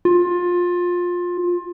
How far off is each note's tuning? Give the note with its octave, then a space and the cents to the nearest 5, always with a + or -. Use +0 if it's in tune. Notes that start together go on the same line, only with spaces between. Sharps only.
F4 +20